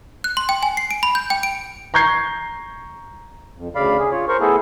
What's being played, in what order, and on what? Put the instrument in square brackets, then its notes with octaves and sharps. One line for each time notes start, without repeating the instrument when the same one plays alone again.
[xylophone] F#6
C6
G5
G#5
C7
D7
B5
G6
G5
D7
[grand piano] A#5 C#6 G6 G#6 C7
[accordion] F2
D2 C#3 D5 F5 B5
G#4
F4 C#5
A#4 C5 C#6
A3 B3 E4 G#4 A4